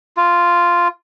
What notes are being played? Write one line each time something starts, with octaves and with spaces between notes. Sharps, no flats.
F4